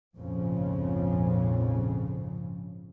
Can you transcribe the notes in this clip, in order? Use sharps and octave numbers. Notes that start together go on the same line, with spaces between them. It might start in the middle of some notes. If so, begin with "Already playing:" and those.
A#1 F2 G#2 C#3 F3